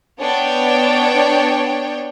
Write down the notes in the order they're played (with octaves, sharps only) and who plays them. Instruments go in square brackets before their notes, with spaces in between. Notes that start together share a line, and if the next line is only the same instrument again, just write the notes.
[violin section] B3 D4 C#5 G5